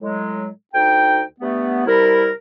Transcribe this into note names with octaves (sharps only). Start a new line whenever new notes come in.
A2 F#3 G#3
D2 D#4 G5
G2 A3 B3
C3 G3 E4 A#4